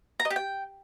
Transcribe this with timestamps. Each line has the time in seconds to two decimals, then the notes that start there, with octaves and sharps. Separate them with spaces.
0.20 A#5
0.25 D#5
0.30 G4
0.36 G5